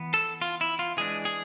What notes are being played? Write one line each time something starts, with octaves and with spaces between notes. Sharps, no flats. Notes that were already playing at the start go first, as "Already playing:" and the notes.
Already playing: E3 B3
A4
F4
E4
F4
E3 G#3 D4 G#4
G#4